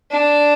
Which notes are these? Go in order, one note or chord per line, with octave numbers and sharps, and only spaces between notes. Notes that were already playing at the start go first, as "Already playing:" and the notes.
D4